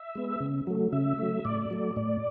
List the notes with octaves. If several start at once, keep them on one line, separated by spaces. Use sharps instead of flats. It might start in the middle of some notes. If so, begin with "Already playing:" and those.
Already playing: E5
G#3 B3
C#3
F#3 A3
C#3 E5
F#3 A3
A2 D5
F#3 A3
A2 D5